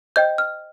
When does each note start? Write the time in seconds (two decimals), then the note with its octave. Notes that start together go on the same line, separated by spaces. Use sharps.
0.16 C5 D#5 G5 G6
0.38 F6